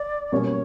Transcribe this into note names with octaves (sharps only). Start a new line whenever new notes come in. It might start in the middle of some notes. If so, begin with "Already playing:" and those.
Already playing: D5
B2 G3 A#3 C#4 C#5